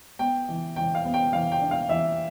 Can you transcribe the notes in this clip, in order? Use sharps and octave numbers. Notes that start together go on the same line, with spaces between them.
B3 G5
E3
E3 G5
F5
B3
G5
E3 F5
G5
D4
F5
E3 E5